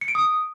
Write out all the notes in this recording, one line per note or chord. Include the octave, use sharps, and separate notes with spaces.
C#7
D7
D#6